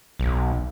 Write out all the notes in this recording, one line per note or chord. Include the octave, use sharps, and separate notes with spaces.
B1